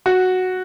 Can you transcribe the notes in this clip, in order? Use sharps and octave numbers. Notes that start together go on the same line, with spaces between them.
F#4